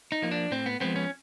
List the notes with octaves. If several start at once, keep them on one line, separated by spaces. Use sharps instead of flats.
D#4
F3 A#3
D4
A2 C4
B3
F3 G#3 B3 C4
C#4